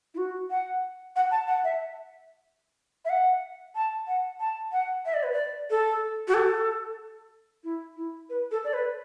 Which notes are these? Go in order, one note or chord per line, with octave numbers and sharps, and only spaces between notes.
E4
F#4
F#5
F#5
A5
F#5
E5
E5
F#5
A5
F#5
A5
F#5
E5
D5
B4
D5
A4
F#4
A4
E4
E4
B4
A4
D5
B4